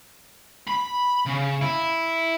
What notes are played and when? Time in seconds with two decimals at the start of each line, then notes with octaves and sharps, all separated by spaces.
0.67 B5
1.26 C#3
1.61 E4